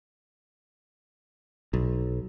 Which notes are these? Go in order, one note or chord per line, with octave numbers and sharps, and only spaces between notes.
B1